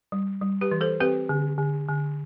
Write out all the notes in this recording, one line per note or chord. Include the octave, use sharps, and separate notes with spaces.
G3
G3
G4 B4
E3
A4 C5
C4 G4 B4
D3
D3
D3